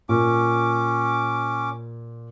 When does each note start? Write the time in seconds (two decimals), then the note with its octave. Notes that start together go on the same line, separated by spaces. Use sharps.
0.09 A#2 C#4 D6